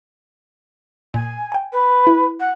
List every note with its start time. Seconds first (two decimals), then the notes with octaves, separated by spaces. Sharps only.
1.14 A#2 G#5
1.52 G5 G#5
1.72 B4
2.07 E4
2.39 F#5